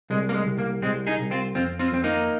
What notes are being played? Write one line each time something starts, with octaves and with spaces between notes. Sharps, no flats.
C2 G#3
A#3
G#3
C2
A#3
C2 G#3 C4
D#4 G#4
C2
C4 F4
F2 C4 F4
C4 F4
F2 C4
A#3 D#4